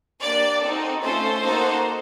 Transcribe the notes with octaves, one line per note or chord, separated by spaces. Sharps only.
A#3 D4 G4 D5
C4 D#4 F#4 A4
A3 C#4 F4 A4 C5
A#3 D#4 F#4 A4